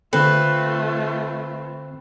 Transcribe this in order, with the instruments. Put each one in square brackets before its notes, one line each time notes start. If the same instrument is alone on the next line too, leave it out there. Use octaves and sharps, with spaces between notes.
[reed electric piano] D3 A4 [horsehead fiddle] A3 F4 [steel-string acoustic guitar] C4 [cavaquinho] B4